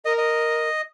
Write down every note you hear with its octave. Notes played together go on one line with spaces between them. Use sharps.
A#4 D#5
D#5